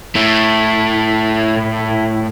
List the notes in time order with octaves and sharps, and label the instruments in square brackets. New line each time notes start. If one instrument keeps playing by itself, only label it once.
[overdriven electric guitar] A2 A3